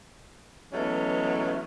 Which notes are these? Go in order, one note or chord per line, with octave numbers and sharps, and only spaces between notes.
E3 F#3 G#3 A3 B3 C#4